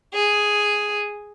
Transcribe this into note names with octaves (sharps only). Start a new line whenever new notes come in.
G#4